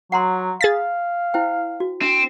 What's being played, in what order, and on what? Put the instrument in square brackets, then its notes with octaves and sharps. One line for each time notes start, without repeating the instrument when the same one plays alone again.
[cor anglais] F#3 [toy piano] F#5 A#5 C6
[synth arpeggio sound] G#4 A6 B6 [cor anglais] F5
[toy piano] E4 C5 G5
F#4
[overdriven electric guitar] C4 [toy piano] D4